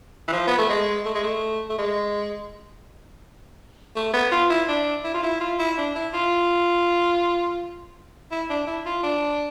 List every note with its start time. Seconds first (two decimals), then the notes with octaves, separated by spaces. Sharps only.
0.28 E3
0.33 F3
0.47 B3
0.58 A3
0.70 G#3
1.05 A3
1.15 G#3
1.24 A3
1.70 A3
1.78 G#3
3.96 A3
4.13 B3
4.32 F4
4.50 E4
4.69 D4
5.04 E4
5.14 F4
5.23 E4
5.41 F4
5.59 E4
5.78 D4
5.95 E4
6.14 F4
8.32 E4
8.50 D4
8.67 E4
8.86 F4
9.03 D4